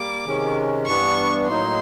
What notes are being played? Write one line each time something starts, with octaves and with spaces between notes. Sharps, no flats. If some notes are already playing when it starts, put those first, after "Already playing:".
Already playing: G3 A#3 D6
C3 D#3 G#3 C#4
G2 E3 G3 B3 D4 C#6
A2 F#3 A#3 D#4 C6